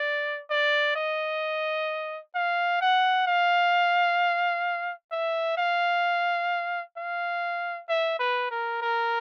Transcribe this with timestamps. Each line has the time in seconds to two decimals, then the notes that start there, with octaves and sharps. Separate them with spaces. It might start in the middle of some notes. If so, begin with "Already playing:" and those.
Already playing: D5
0.50 D5
0.96 D#5
2.35 F5
2.81 F#5
3.27 F5
5.12 E5
5.58 F5
6.97 F5
7.89 E5
8.20 B4
8.51 A#4
8.82 A#4